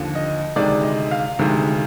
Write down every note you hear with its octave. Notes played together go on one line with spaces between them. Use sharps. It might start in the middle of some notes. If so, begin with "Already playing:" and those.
Already playing: D#2 D3 F3
D#5
D2 C3 D#3 G#3 D5
D#5
F5
D2 C3 D#3 G#3